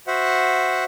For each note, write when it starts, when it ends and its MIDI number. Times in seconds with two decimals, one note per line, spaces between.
0.07 0.84 66
0.07 0.84 72
0.07 0.84 76
0.07 0.84 78